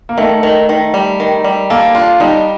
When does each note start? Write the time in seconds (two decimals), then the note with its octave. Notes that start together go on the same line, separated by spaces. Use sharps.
0.09 A#3
0.18 D#3 A3
0.43 D#3
0.69 D#3
0.94 G3
1.20 D#3
1.44 G3
1.70 A#3 A4
1.95 D4 F4
2.20 G3 D#4